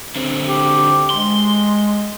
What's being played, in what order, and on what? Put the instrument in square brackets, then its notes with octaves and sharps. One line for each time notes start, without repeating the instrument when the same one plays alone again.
[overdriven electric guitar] D3 C4
[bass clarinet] G4
[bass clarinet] G#3 [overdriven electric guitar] C6